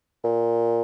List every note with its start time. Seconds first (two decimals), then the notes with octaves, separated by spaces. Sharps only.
0.24 A#2